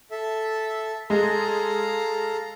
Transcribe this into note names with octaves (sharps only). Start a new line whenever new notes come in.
A4 E5
G#3 A4 F5 A#5